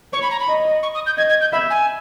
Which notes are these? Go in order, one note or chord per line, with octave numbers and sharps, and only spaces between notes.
C#5 C#6
B5
A#5
B5
D#5
C#6
D#6
G6
D#5 G#6
G#6
G6
E5 B5
G#5